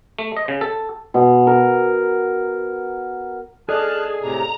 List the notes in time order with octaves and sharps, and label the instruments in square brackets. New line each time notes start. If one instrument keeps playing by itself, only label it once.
[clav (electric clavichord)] A3
D#5
C#3
A4
[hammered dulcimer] B2
A#4
[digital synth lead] G#4 [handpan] A4 D5 D#5 [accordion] A5 F6 F#6
[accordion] A2 C3 [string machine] A#5